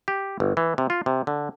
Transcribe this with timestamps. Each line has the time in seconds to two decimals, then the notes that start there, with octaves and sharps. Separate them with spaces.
0.08 G4
0.40 G1
0.57 E3
0.78 C3
0.90 F4
1.06 C3
1.27 D3